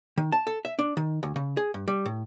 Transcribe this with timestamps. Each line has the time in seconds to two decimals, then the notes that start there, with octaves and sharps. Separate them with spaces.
0.18 D#3
0.32 A5
0.47 A4
0.65 E5
0.79 D4
0.97 D#3
1.23 D2
1.36 C#3
1.57 G#4
1.74 G2
1.88 G3
2.06 A2